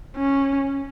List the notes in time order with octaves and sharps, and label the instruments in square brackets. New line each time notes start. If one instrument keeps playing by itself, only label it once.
[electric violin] C#4